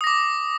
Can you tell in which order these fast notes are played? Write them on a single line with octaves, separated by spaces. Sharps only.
D#6 A#6 D6